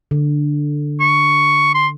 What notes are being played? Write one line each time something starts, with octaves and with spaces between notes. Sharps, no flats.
D3
C#6
C6